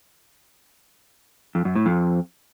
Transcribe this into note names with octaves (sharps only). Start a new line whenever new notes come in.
F2
F#2
A2
F2